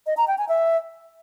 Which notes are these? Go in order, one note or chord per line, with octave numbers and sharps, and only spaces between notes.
D#5
A#5
G5
G#5
E5